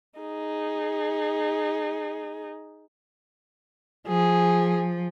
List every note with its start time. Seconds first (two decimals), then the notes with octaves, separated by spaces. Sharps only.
0.20 D#4 G#4
4.08 F3 G#4